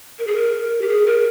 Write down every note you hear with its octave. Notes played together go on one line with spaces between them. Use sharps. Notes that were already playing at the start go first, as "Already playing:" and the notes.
A#4
G#4
A#4
G4
G#4
A#4